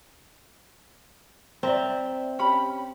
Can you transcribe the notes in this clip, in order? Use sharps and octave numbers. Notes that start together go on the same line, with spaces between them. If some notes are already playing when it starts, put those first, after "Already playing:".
C4 D5 E5 A#5
C#4 G4 B5